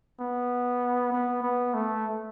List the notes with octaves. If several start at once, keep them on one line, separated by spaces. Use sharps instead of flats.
B3
B3
B3
A3